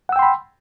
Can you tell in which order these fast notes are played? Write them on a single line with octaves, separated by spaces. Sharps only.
F#5 E6 G5 C6 B5